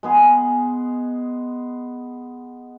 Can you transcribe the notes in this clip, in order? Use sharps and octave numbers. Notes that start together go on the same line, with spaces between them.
G#3 B3 G#4